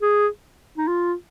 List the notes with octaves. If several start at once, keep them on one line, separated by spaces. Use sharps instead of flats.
G#4
D#4
F4